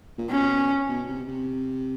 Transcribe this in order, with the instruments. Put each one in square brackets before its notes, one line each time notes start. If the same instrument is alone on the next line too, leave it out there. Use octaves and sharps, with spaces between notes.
[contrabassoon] A#2
[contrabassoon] B2 [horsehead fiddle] C#4
[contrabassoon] B2
C3
C3